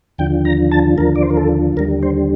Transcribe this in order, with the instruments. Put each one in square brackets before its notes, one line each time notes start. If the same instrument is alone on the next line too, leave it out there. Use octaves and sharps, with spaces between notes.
[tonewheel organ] D#2 D3 F3 G5
A#5
A5
D#2 D3 F3 A#4
D5
C5
A#4
A4
D#2 D3 G3 A#4
C5